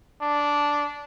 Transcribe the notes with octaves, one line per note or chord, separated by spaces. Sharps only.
D4